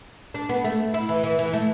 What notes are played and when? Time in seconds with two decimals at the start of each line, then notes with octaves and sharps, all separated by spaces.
0.34 D4
0.49 B3
0.64 A3
0.94 E4
1.09 E3
1.24 E3
1.39 E3
1.53 A3